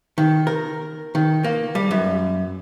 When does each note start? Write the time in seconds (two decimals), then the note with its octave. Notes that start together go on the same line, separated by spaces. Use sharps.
0.18 D#3
0.47 A#4
1.15 D#3
1.44 A#3
1.75 G3
1.91 F#2